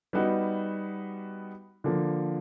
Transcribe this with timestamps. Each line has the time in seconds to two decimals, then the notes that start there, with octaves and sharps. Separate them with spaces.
0.13 G3 B3 D#4 F#4
1.84 D3 F3 A#3